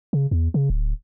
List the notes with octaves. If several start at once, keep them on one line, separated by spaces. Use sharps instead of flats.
C#3
E2
C#3
D1